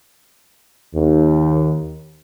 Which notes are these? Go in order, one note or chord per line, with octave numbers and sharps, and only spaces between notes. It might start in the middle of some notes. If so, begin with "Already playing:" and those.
D#2